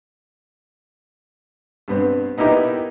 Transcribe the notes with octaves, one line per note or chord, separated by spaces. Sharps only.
G2 B3 C4
B3 D#4 E4 G4 A#4